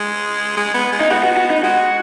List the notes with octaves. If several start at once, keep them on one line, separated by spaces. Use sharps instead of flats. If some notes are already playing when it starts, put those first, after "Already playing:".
Already playing: G#3
G#3
B3
G#3
D#4
B3 F#4
F#4
F#4
D#4
B3
G#3 F#4